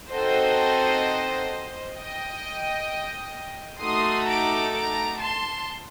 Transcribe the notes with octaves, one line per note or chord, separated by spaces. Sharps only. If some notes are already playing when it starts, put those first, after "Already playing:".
C4 D#4 F#4 A4 C5 D#5
D#5 G5
A3 D#4 F#4 A4 C6 D#6
A#5 D6
A#5 D6
A5 C6